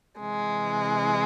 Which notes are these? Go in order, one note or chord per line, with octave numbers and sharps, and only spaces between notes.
C3 E3 G#3